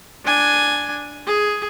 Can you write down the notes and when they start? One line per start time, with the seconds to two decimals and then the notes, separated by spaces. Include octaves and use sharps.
0.25 D4 G#5
1.27 G#4